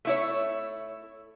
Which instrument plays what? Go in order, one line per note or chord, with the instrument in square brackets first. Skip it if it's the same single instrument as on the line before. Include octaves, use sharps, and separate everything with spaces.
[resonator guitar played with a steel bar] A3 E4 C#5